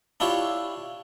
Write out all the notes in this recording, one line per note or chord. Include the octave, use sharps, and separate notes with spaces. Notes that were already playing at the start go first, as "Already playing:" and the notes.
D4 E4 F4 G4 C#5